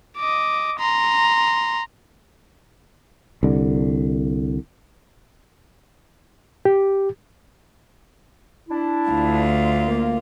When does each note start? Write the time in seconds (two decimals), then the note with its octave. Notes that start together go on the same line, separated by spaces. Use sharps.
0.17 D#5 D6
0.79 A#5 C6
3.43 C2 D3
6.65 G4
8.69 D4 E4
9.09 D2 F4
9.86 A#3